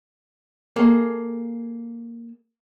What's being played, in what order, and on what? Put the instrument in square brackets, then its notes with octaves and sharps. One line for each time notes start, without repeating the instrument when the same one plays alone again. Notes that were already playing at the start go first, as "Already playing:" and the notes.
[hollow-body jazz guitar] A#3 G#4 A4